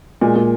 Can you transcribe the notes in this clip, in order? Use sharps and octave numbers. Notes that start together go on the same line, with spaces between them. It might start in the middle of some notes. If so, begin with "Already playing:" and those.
A#2 G#3
A#2